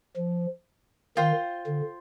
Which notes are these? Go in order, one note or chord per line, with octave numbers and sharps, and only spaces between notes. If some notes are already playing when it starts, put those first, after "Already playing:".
F3
D#3 F4 C5 G5
D3